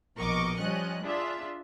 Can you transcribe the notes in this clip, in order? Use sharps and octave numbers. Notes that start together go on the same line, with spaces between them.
A#1 B2 A#4 D#5 C#6 D6
F3 G3 C#4 D#5 F#6
D4 F4 G#4 E5